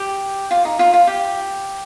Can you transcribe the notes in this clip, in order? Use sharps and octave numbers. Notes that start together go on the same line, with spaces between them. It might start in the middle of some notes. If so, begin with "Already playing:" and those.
Already playing: G4
F4
D#4
F4
F4
G4